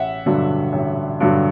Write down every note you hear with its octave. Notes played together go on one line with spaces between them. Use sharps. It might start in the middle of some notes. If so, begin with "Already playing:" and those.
Already playing: A1 E5 F#5
G2 D3 F#3
A1
G2 D3 F#3